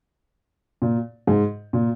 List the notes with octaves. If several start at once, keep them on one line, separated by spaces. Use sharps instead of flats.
A#2
G#2
A#2